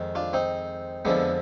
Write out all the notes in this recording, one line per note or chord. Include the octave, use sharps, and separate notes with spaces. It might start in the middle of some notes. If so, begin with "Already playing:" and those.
Already playing: F2 D#3 G#3
D4 F4
C4 D#4
F2 D3 F3 G#3 B3 D4